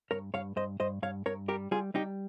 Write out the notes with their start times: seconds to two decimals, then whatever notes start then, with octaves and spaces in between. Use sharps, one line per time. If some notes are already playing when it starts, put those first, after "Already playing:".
0.11 G2 A#4 C#5
0.34 G2 C#5 F5
0.56 G2 C5 D#5
0.80 G2 C5 D#5
1.02 G2 C#5 F5
1.26 G2 A#4 C#5
1.48 G3 G4 A#4
1.71 G3 F4 G#4
1.94 G3 D#4 G4